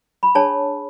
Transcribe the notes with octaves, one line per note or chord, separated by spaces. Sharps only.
B5
D4 G#4 C#5 A5